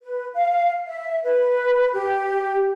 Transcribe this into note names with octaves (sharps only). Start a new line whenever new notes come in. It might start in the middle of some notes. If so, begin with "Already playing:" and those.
B4
F5
E5
B4
G4